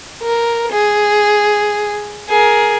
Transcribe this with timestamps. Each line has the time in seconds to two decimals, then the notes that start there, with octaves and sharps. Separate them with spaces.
0.22 A#4
0.71 G#4
2.29 G#4 A#4